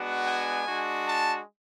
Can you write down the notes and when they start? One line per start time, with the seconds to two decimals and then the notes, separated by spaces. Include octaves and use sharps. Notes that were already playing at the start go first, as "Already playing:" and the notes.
Already playing: G#3 B3 D4 F#4
0.28 G#5
0.67 G#3 D4 F#4
1.06 A5